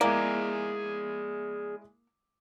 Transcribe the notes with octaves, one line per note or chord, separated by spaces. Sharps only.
G#3 A#3 E4 G#4 D5 D6